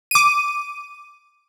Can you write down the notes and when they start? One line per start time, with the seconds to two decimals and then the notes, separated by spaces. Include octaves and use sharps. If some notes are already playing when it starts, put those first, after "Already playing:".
0.11 D6 D#7